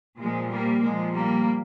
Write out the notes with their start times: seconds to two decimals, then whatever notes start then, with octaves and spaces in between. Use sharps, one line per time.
0.18 A#2 F3 G#3
0.50 G3 A#3
0.82 A#2 F3 G#3
1.14 G3 A#3